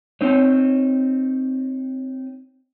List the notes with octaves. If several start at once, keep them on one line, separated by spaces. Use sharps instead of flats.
C4 D#4 C#5